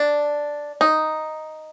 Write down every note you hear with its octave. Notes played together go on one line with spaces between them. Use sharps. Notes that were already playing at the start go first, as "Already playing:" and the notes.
Already playing: D4
D#4